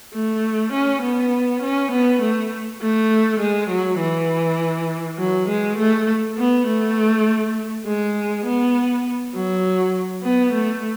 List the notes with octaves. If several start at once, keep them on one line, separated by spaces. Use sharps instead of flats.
A3
C#4
B3
C#4
B3
A3
A3
G#3
F#3
E3
F#3
G#3
A3
B3
A3
G#3
B3
F#3
B3
A3